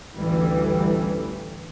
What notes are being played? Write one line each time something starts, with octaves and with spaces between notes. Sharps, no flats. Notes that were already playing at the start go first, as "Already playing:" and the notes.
A1 D2 E3 G3